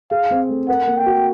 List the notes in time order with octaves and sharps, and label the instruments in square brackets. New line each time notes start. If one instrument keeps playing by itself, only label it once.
[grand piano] G#4 [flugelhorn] F5
[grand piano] C4
A3
[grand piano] A#4 [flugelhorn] F#5
[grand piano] A#3
[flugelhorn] G5
[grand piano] F#4